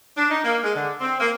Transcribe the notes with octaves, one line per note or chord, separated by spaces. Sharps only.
D4
D#4
A#3
G#3
D3
C4
A#3